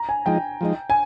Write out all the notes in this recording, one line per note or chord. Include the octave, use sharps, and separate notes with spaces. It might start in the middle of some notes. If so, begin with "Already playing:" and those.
Already playing: A#5
G#5
F3 G#3 D#4 G5
F3 G#3 D#4
G#5